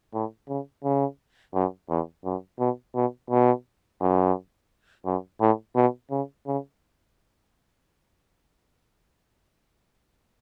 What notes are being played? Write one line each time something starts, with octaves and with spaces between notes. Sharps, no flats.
A2
C#3
C#3
F#2
E2
F#2
B2
B2
B2
F#2
F#2
A2
B2
C#3
C#3